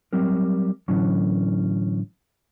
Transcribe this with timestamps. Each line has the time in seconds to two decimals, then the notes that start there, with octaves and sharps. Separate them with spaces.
0.13 F#3 G3 C4 A#4
0.88 A2 D3 E3 F#3 C#4